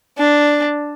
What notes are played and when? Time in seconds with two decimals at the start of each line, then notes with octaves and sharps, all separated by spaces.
0.18 D4